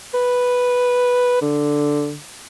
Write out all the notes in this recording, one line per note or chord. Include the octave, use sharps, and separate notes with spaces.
B4
D3